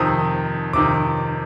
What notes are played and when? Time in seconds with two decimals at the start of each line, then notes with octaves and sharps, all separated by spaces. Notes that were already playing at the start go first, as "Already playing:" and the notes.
Already playing: F2 C3 D#3 D#6
0.73 F2 C3 D#3 D6